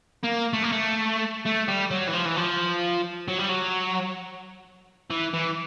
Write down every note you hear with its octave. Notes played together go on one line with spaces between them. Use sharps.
A#3
A3
A#3
A3
A3
G3
F#3
E3
F3
E3
F3
F#3
G3
F#3
E3
E3